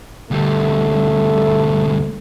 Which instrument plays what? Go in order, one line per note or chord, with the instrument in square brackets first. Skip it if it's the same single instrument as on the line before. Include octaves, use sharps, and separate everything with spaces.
[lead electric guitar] D2 G3 [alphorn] A3